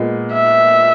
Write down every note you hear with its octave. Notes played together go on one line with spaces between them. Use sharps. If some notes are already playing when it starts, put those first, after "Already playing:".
Already playing: A#2 G#3 B3
E5